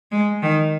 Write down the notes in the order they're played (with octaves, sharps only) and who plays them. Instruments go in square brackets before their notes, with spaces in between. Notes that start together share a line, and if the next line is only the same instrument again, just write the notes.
[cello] G#3
D#3